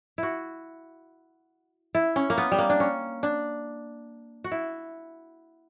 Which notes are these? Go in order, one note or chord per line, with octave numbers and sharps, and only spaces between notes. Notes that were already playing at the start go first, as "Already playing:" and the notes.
E4 F#4
E4
C#4
A#3
B3
G3
A#3
D4
C#4
D4
F#4
E4